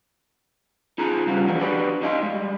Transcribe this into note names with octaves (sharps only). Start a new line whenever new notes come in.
D#4 F4 G#4 A5 A#5
C#3 G3 F4 F#4
E3 F3 G3 A#3 F#4
D4 F#4 G4 B4 C#5 D5
D#4 D#5 F5 G5 C6
G3 G#3